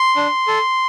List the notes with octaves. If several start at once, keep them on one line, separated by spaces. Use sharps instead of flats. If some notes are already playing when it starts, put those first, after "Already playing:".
Already playing: C6
D4
A4